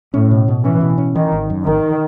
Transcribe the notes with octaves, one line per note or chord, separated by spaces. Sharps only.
A2 C#4
B2
B2
E3 C#4
B2
C#4
D#3 E3
G#1
F#2
G#1 D#3